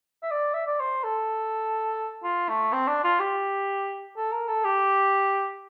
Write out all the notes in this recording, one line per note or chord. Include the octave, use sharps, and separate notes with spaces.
E5
D5
E5
D5
C5
A4
F4
A3
C4
D4
F4
G4
A4
A#4
A4
G4